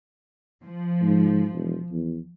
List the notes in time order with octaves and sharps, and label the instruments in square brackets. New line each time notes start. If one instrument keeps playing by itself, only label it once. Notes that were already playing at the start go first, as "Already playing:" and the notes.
[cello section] F3
[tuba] G#2
E1
E2